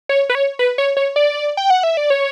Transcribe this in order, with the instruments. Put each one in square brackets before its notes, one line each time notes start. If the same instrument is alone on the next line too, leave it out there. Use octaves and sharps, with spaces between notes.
[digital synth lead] C#5
B4
C#5
B4
C#5
C#5
D5
G5
F#5
E5
D5
C#5